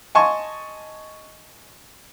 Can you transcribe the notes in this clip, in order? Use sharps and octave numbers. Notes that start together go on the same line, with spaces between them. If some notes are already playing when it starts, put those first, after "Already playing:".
D#5 G#5 A5 C6 C#6